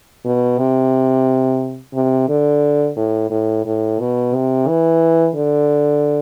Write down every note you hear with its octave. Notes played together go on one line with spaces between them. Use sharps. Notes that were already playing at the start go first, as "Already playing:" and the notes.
B2
C3
C3
D3
A2
A2
A2
B2
C3
E3
D3